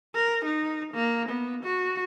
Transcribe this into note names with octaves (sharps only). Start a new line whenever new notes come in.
A#4
D#4
A#3
B3
F#4